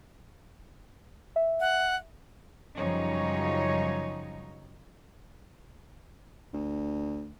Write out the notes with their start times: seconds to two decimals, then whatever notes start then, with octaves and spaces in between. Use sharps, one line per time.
1.36 E5
1.60 F#5
2.76 F#2 C#3 F3 G3 D#4 C#5
6.54 D2